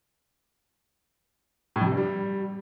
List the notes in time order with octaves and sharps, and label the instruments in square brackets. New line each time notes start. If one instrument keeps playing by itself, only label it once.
[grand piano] A2
F2
C3
G2
G3